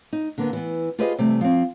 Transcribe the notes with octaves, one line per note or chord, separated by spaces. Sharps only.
D#4
D3 A#3 B3
E3 B3
F4 G4 G#4 B4 C5 D#5
C3 E3 G3 A3
F3 C4